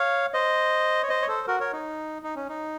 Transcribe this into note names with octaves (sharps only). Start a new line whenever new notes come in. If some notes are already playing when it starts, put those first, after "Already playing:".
Already playing: C#5 F5
C5 D#5
C#5
C5 D#5
C#5
A4 C5
F#4 A#4
A#4 C#5
D#4
D#4
C#4
D#4